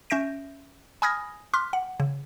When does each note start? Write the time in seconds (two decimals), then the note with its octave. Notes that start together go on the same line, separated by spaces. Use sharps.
0.10 C#4 E5 G6 A#6 D7
1.02 G#5 B5 D#6 F6 G#6 A#6
1.54 C6 D6 F6 F#6 B6
1.73 F#5
2.00 C#3